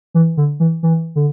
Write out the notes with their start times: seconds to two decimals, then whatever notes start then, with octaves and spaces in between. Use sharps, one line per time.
0.14 E3
0.37 D3
0.60 E3
0.83 E3
1.16 D3